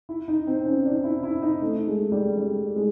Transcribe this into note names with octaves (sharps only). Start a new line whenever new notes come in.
E4
D#4
C4
C#4
D4
E4
E4
D#4
A3
G#3
G3
G3
G#3